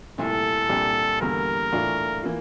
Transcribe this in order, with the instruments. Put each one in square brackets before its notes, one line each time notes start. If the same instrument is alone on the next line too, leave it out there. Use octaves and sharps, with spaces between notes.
[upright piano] C2 A#2 A3 E4 [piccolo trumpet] A4
[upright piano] C2 A#2 G3 D4 G4
[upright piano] E2 D3 G3 A#3 [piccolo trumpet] A#4
[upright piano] A2 E3 A3 D4 F4
E3 A#3 F4